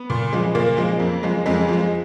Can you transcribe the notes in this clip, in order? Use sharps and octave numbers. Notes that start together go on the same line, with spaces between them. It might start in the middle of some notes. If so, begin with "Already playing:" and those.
Already playing: B3
A#2
F3 G#3
A#2 A#3
F3 G#3
F2
F3 G#3
F2 G#3
F3 G#3